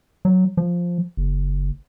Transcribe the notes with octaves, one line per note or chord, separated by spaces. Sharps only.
F#3
F3
F#1